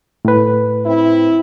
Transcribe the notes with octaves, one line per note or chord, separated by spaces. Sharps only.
A2 B4
C4 E4